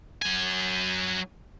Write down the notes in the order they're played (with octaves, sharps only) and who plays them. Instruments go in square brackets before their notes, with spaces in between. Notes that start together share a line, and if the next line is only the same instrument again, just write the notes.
[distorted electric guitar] F#3 G#5